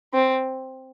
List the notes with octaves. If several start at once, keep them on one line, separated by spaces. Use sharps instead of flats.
C4